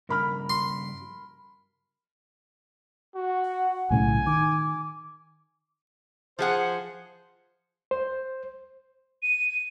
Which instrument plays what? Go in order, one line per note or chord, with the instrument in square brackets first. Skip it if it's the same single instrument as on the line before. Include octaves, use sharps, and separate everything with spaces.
[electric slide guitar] G2 C#3 [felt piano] A#4 B5 F6
[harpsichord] C6
[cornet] F#4
[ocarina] F#5
[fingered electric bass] B1 A2 C#3 [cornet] G#5
[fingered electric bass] D#3 [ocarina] D6
[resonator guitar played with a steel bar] F3 G#4 F#5 [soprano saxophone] C5
[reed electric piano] C5
[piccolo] D#7